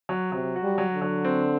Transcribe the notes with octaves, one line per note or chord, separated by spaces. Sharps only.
F#3
C3 F#3
F#4
G3
F#3
D3
F#3
C4